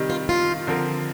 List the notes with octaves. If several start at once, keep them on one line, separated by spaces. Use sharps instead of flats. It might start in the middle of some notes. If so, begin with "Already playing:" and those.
Already playing: C3 D#3 G3
F4
F4
D3 F3 C4 F4 A#4